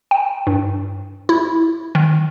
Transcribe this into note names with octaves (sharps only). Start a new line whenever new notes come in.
G5
G2
E4
D#3